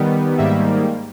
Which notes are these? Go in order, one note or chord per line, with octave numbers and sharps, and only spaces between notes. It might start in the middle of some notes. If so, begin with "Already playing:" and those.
Already playing: D#3 G3 B3
G#2 D#3 G3 A#3 E5